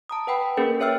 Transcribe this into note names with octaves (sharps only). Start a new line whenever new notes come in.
A5 A#5 D#6
B4 F#5 G5 B5
A#3 C#4 G#4 A#4 B4
G#4 C#5 E5 G5 E6 F6